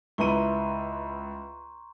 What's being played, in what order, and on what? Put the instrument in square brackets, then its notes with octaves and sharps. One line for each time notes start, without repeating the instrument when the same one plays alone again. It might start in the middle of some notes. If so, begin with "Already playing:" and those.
[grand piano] C#2 D#7 [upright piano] E4 A#4 B4 [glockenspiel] A#5 C6 C#6